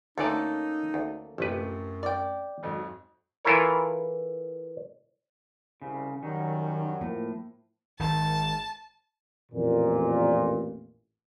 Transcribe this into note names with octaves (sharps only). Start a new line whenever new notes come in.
D2 D3 A3 A#3 C#4 D#4 A4 D5
D2
A1 F#2 A2 C3 F3 B4
D5 G5
G#1 F2 F#3
E3 E4 F4 A4 A#4 C#5
C2 C#3
F#2 D#3 F#3 G3
A2 F3 A#3
G#1 D#3 A5
A1 F2 A#2